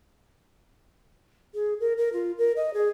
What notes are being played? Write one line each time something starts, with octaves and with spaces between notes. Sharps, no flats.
G#4
A#4
A#4
F4
A#4
D#5
G#4